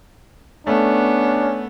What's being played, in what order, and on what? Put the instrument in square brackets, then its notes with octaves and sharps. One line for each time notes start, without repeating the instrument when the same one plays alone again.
[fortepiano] A3 [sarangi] B3 [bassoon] C#4 [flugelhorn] D4